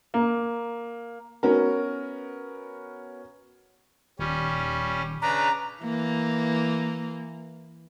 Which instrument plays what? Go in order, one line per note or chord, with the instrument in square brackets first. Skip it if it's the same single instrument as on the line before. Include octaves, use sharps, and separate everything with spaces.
[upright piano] A#3
[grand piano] B3 C#4 F#4 A#4
[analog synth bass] D#1 [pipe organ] G3 C#4
[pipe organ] C#3 D4 B4 [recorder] A#5
[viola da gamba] E3 A#3